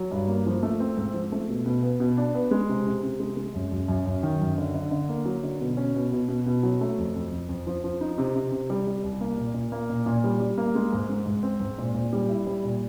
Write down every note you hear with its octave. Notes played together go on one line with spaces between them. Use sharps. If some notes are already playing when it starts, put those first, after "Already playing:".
Already playing: F#3
G2
A#3
F3
A3
C4
G#2
F3
A3
B2
B2
B3
B2
D4
B3
G#3
C3
C3
C3
G#3
G#3
F#2
F#2
F#2
F#2
D#3
F#2
D3
D3
D3
A#3
F#3
D3
B2
C#4
B2
B2
B2
B2
F#3
A3
F2
F2
F2
F2
F3
F3
D#4
C3
C3
C3
G3
G3
C2
A#3
A#2
A#2
A#3
A#2
A#2
G3
G3
A#3
G#3
G#2
G#3
G#2
C4
G#2
A#2
A#2
G3
E4
G3
A#2